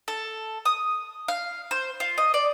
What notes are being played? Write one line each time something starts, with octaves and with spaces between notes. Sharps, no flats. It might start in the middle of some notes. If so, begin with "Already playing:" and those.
A4
D#6
F5
C5
F4
D#5
D5